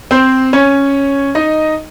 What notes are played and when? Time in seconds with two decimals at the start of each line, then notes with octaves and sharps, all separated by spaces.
0.11 C4 C5
0.53 C#4 C#5
1.35 D#4 D#5